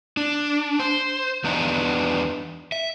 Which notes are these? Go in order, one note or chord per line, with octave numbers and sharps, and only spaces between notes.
D4
C5
E2 B3 D4 D#4
E5